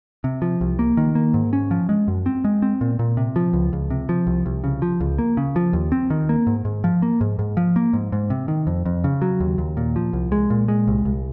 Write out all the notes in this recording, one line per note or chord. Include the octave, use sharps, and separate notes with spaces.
C3
F3
C2
A#3
D#3
A#3
G#2
C#4
F3
G#3
F#2
C4
G#3
C4
A#2
A#2
C3
F3
C#2
C#2
C3
F3
C2
C2
C#3
F3
C#2
A#3
C#3
F3
D#2
C4
D#3
A#3
G#2
G#2
F3
A#3
G#2
G#2
F3
A#3
G#2
G#2
C3
D#3
F2
F2
C#3
F#3
D#2
D#2
A#2
F3
C2
G#3
A#2
G#3
C2
C2